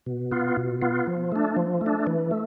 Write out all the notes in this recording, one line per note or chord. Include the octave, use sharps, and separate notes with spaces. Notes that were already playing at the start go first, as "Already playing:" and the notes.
B2
B3 F4
B2
B3 F4
F3
A3 D4
F3
A3
D4
E3
A3